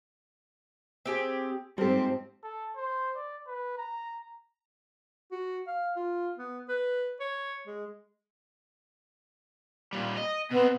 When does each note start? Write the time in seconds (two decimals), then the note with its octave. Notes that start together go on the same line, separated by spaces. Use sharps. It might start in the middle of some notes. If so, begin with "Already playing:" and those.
1.06 C4 G4 G#4
1.78 G#2 F3 G3 C4 G4 A4
2.44 A4
2.76 C5
3.16 D5
3.47 B4
3.77 A#5
5.32 F#4
5.67 F5
5.96 F4
6.38 B3
6.69 B4
7.20 C#5
7.67 G#3
9.93 A#2 G3
10.17 D#5
10.51 B2 B3 C4